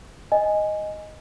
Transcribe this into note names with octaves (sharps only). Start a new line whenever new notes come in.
D#5 G#5